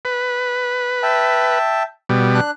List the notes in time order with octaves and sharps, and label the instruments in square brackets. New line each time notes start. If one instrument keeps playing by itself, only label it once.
[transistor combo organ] B4
[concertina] E5 G5 A5
[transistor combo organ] B2 G3
[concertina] D4 F#6